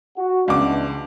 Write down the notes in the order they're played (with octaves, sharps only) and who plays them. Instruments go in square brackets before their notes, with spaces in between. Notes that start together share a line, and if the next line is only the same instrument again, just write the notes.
[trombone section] F#4
[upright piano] C#2 D6 [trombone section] E3 B3 D4